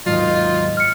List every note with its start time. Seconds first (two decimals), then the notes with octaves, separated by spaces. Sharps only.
0.06 D#2 G#2 D#3 F#3 D#4 F4
0.77 F6 C#7